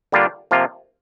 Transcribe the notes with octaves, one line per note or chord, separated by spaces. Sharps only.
D3 G3 A#3 D4 F4
C3 F3 A#3 F4